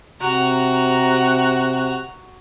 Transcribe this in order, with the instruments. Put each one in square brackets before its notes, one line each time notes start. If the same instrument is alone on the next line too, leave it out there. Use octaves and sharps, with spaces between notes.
[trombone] C3 [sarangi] F#4 [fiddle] A#5